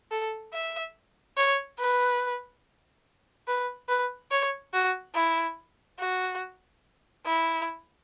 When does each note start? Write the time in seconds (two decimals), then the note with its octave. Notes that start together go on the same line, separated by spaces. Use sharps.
0.12 A4
0.53 E5
1.37 C#5
1.79 B4
3.47 B4
3.88 B4
4.31 C#5
4.73 F#4
5.15 E4
5.99 F#4
7.25 E4